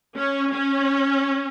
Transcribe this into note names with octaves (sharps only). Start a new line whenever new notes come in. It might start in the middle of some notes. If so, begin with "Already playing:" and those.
C#4
C#4